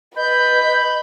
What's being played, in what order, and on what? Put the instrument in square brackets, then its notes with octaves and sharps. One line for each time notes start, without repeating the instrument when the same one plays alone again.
[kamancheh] B4 [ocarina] D#5 [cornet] B5 [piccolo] G6